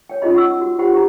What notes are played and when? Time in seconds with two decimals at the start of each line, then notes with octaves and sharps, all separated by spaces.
0.09 C#5 G5
0.22 C#4 D#4 F4 G#4 D#5 B5
0.34 F#5 C#6 E6
0.61 F#4
0.78 F4 G4 C5 F#5 G5 B5
0.93 D#4 G4 C5 G5 A#5